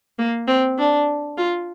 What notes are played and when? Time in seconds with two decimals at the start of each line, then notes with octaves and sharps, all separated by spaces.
0.18 A#3
0.48 C4
0.78 D4
1.38 F4